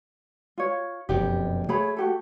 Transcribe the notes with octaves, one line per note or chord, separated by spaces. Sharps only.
F4 C#5
F1 F#2 B2 D#4 G4
A3 G#4 C#5 B5
F#4 G4 A4